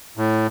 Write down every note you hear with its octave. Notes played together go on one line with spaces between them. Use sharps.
A2